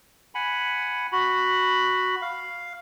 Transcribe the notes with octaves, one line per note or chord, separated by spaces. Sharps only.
F#5 G#5 B5
F#4 B5
F5